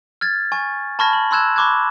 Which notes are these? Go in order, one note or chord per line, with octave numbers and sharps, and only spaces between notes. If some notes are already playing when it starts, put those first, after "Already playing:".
F6 G#6 A6
G#5 C#6
A5 B5 C#6 F6 G#6 A#6
F#7
B5 C6 E6 F#6 G#6 E7
B5 C#6 D6 F#6 G#6